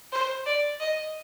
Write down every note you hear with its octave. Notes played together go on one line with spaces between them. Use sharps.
C5
D5
D#5